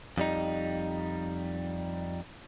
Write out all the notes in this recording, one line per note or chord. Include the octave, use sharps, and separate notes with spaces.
F2 G3 D#4